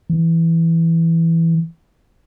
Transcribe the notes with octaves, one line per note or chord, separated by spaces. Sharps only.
E3